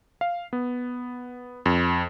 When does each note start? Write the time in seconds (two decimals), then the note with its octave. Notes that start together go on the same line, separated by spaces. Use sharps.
0.21 F5
0.53 B3
1.66 F2